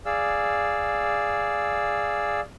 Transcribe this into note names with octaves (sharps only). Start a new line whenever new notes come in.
G#4 D5 F5 E6